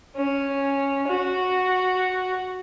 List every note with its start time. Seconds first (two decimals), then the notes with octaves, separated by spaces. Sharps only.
0.16 C#4
1.08 F#4